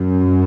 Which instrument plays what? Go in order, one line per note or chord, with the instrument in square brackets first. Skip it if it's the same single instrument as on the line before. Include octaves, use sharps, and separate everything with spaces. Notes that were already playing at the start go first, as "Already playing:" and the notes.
Already playing: [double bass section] F#2